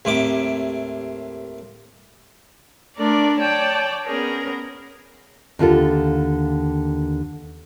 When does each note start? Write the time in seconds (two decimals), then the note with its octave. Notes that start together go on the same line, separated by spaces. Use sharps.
0.05 D#2 A2 C3 D6
2.97 A3 D4 A#4 D5
3.39 C#5 D5 G5 A5 D6
4.05 B3 C#4 G#4 A#4
5.59 D#2 D3 F4 A4